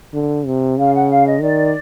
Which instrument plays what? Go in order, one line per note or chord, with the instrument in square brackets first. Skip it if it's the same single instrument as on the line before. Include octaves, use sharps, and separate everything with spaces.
[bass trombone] D3
C3
[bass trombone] C#3 [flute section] F5
[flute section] F#5
F5
D#5
[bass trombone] D#3 [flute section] D5